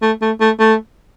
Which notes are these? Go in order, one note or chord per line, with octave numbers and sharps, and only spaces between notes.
A3
A3
A3
A3